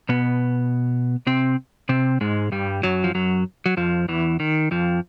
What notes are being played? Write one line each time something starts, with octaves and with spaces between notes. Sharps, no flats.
B2 B3
C3 C4
C3 C4
G#2 G#3
G2 G3
F#2 F#3
F3
F#2 F#3
F#3
F2 F3
E2 E3
D#3
F2 F3